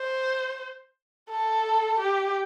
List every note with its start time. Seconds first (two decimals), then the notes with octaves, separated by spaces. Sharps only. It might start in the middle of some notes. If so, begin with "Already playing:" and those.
Already playing: C5
1.30 A4
2.00 G4